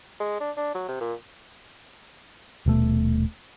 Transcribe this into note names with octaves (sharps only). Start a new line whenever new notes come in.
G#3
D4
D4
F#3
C3
A#2
D#1 B2 A3